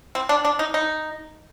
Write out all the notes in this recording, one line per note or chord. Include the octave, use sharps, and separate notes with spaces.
C4
D4
D4
D#4
D#4